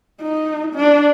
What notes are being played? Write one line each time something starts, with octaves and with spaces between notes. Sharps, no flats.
D#4
D4